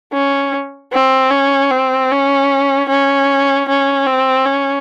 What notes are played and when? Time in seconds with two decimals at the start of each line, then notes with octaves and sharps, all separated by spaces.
0.13 C#4
0.93 C4
1.31 C#4
1.71 C4
2.11 C#4
2.89 C#4
3.68 C#4
4.06 C4
4.46 C#4